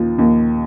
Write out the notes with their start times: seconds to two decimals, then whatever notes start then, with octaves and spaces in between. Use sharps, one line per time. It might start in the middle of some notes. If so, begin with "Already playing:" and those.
Already playing: D#2 F3
0.18 D#2